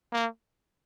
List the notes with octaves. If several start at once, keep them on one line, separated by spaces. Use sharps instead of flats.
A#3